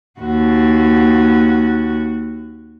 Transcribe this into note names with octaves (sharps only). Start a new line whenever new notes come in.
D#2 F#4